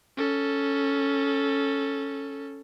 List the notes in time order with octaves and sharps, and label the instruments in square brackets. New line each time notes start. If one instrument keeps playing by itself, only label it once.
[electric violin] C#4 A4